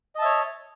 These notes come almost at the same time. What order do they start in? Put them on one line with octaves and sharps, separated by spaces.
D#5 A5 E5 C#5